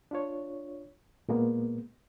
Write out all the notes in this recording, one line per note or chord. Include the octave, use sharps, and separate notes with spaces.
D4 F4 C#5
A#2 G#3 A#3 B3